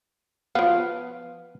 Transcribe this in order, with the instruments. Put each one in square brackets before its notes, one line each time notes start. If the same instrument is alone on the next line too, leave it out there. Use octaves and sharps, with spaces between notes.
[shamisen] F3 B3 [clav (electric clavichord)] F5